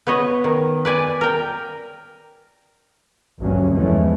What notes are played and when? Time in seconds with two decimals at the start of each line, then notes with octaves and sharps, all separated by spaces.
0.07 B3 B4 C#5 D#5
0.44 D#3
0.85 B4 D5 G#5
1.21 A#4 G5
3.39 A1 D2 G2 F#3 A#3 C#4
3.72 E2 E3 F3 G#3 A3 C#4